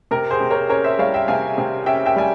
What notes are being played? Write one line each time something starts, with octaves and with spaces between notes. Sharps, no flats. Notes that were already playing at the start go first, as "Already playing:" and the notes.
C3 A#4
G#4 C5
C3
A#4 C#5
C#4 A#4 C#5
C5 E5
G3 C#5 F5
E5 G5
C3 F5 G#5
C3
C#4 E5 G5
E5 G5
G3 G#5